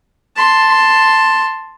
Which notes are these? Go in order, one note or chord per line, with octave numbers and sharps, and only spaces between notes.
A5 C6